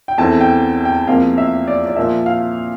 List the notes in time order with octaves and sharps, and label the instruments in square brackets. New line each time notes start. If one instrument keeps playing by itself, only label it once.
[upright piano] G5
E2 E3 A3 C4 A5
G5
G5
E2 C3 F3 A#3 F5
E5
D5
D5
A#2 F3 A#3 E5
F5